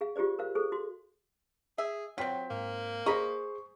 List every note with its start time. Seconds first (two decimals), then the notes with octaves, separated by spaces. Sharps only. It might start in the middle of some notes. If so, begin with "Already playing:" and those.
0.01 G#4 F5
0.16 F4 G4 G#4 C5 D5
0.39 A#4 C5 F5
0.55 G#4 A4 C5 G#5
0.72 F#4 C6
1.78 G#4 E5
2.18 F#3 C4 F4 C5 G5 B6
2.51 G#2 A#3
3.06 G#4 C5 D#5 A#5 B5 C#6